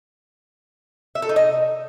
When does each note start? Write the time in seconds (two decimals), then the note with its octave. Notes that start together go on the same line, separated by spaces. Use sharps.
1.15 E5
1.22 A4
1.29 D#4
1.36 D#5